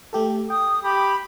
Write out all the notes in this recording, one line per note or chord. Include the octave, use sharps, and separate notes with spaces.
A3 G4 A4
G5 D#6
G4 B5